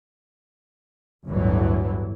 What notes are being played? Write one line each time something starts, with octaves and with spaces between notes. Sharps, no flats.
G1 D2 A2 E3 F#3